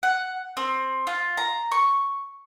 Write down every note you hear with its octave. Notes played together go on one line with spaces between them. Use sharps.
F#5
C4
F4
A#5
C#6